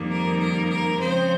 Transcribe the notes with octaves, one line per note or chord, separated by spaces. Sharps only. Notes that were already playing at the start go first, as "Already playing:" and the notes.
Already playing: F2 D#3 G3 A#3
A#4
A#4
A#4
C#3 F3 G#3 C4 C5